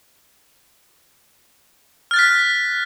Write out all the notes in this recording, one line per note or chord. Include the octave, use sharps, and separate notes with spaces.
F6 F#6 A6 B6